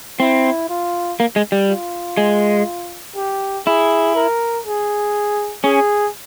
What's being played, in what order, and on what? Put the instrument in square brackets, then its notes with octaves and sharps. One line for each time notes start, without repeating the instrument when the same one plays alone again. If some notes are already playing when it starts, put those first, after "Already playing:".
[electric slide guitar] C4 [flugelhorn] E4
[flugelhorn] F4
[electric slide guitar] A#3
G#3
G3
[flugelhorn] F4
[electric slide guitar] G#3
[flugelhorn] G4
[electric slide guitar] E4 [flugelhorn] G#4
[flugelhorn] A#4
G#4
[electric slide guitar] C#4 [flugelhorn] G#4